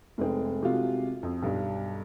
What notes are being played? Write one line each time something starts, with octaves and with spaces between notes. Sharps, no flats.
F1 G#3 C4
C3 G#3 F4 F#4
F2
B1 G2